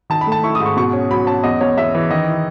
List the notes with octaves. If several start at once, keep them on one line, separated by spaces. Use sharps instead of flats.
D#3 A5
B5
A3
A5
E4 C#6
D#6
G#2
C#6
B2 C#6
C#4
F#3 B5
C#4 A5
E2 D#5
E2 C#5
E2 E5
E3
D#3 D#5
E4